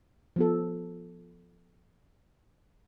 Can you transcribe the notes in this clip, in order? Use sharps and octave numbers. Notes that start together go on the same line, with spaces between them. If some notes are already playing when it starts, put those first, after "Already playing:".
F3 B3 A4